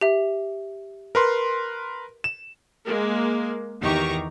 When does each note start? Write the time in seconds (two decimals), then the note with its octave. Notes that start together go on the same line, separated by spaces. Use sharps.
0.01 G4 E5
1.15 A#4 B4 C6
2.24 E7
2.85 G#3 A#3
3.80 E2 D#3 G4 A#5 C#6